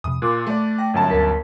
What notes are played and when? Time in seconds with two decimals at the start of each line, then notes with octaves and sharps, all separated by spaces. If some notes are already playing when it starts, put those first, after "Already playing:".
0.04 F2 C3 D#6
0.22 A#2 C6 D6 F#6
0.47 A3 D5
0.78 G5 A#6
0.94 G1 F#2 A5
1.10 D2 A#4 B6